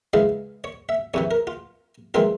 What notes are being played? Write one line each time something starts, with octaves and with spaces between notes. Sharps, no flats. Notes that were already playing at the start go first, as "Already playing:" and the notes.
C#3 E3 G#3 E4 F5
C#5
E5
E2 C3 E3 C#5
A#4
F4
E3 G#3 C4 F4 A#4